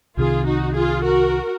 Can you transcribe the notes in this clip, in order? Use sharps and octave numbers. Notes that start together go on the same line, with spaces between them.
C2 C3 D#3 F4 G#4
D#4 F#4
F4 G#4
F#4 A#4